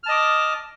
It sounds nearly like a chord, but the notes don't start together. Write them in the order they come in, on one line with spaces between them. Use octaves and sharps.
F6 A5 D#5 D6